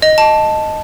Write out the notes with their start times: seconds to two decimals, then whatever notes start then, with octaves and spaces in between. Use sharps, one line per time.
0.02 D#5
0.18 A5